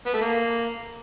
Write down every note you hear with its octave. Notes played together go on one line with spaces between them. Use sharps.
B3
A3
A#3